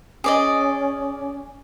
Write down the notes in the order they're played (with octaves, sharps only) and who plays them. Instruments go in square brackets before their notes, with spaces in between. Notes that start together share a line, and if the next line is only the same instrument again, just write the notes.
[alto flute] C#4 [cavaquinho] G#4 D5 D#5